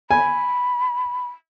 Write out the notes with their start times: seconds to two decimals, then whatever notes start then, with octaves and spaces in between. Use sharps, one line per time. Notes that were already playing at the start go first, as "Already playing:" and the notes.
0.11 G#5 B5